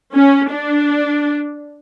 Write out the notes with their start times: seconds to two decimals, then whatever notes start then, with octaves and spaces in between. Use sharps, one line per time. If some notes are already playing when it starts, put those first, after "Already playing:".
0.15 C#4
0.50 D4